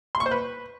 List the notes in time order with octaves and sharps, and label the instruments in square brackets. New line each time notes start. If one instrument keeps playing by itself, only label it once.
[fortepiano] C6
C#6
C5
B4